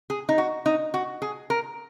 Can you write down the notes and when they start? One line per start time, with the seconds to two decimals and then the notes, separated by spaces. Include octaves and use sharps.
0.10 G#4
0.29 D#4
0.38 F#4
0.66 D#4
0.94 F#4
1.22 G#4
1.50 A#4